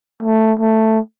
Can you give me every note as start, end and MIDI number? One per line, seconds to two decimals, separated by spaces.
0.23 0.53 57
0.59 0.99 57